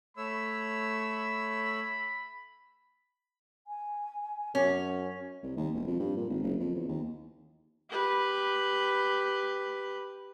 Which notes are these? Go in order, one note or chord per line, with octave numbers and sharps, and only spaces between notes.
A3 C#5 B5 E6
G#5
F#2 C#4
C2
D#2
E1
F2
G2
A#2
G#1
F#1
F2
E2
D#2
G4 B4